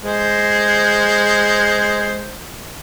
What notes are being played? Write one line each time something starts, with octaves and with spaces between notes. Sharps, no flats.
G#3 C5